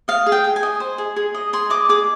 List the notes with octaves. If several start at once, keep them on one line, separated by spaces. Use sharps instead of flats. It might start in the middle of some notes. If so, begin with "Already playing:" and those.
D#5 F5
G#4
G5
G#4
G#5
D#5
C5
G#4
G#4
D#5
G#4 C6
D#5 D6
G#4 D6